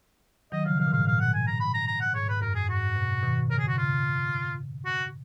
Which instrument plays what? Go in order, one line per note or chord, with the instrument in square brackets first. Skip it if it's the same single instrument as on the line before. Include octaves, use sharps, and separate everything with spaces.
[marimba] D#3 F#3 [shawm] D#5
[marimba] C#3 F3 [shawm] F5
[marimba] B2 D#3 [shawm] F5
[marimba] A#2
[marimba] G#2 [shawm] F5
[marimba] A#2 [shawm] F5
[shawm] F#5
G#5
A#5
B5
A#5
A#5
F#5
[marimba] G#2 [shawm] C#5
[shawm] B4
[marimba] F#2 [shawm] A#4
[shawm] G#4
[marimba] G#2 [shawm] F#4
[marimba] B2
B2 D#3
[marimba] C#3 [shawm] A#4
[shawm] G#4
F#4
[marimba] C#3 [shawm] F4
[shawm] F#4